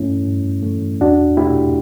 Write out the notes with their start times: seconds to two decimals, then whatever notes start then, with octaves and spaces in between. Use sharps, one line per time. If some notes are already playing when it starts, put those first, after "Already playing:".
Already playing: G2 E3 A3 C#4 E4
0.25 G2
0.63 E3 A3
1.00 E2 D4 F#4
1.37 B2 A3 E4 G4